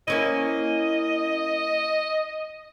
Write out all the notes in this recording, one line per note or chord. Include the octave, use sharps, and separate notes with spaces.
A#3 C#4 E4 D#5